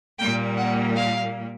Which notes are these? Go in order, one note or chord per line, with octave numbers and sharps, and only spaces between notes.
A#2 G3 A#3 G5
F#5
F5